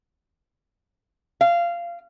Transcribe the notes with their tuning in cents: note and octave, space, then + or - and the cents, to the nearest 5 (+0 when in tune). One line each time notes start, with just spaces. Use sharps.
F5 -20